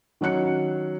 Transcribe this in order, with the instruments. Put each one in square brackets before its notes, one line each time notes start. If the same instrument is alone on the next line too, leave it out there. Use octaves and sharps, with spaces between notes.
[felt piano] D#3 F#3 C#4 F#6 C#7